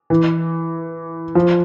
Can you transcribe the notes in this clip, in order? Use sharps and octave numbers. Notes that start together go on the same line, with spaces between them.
E3
F3